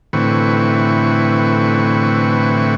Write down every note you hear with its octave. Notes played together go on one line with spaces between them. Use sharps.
A2 D3 E3 C4 B4 C#6